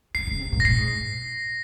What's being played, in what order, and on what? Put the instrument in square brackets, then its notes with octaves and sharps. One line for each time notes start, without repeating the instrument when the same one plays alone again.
[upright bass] C#3 [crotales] C7
[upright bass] C#3
C3
A#2
[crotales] A#6
[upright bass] A#2 [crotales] C7
[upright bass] G#2